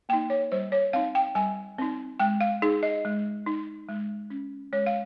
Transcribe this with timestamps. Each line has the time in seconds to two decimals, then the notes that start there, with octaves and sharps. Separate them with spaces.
0.09 A#3 D#4 G5
0.30 C#5
0.52 G3 C5
0.72 C#5
0.93 C4 D#4 F5
1.15 G5
1.35 G3 G#5
1.78 C4 D#4
2.19 G#3 G5
2.41 F5
2.62 D#4 G#4
2.83 D#5
3.05 G#3
3.46 D#4
3.89 G#3
4.30 C#4
4.73 G#3 C#5
4.86 F5